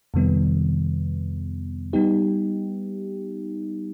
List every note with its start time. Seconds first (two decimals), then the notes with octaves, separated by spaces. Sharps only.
0.14 F2 C3 D#3 G3 B3
1.93 G3 B3 D#4 G4